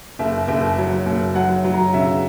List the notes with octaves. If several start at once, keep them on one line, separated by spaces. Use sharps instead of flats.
F#1 E5
F#1 E5
F#3
F#1
F#3 F#5
F#3
A#5
C#3 E5